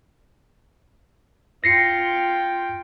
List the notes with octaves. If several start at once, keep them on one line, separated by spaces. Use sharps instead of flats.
F4 G5 A#6 C7 C#7